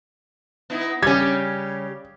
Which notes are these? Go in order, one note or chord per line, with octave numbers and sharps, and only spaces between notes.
B3 D#4 E4
C#3 G3 C#4 G4 G#6